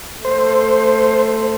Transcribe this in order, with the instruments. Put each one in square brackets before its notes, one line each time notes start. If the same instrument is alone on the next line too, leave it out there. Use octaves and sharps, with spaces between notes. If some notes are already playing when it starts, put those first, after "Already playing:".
[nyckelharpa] A3 [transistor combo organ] C5